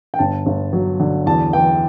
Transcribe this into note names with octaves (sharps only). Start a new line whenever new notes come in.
G5
G1 A5
G1
F#3
D3
E2 A5
E3 G5